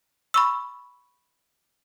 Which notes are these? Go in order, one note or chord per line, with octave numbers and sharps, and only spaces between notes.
B5 C#6 E6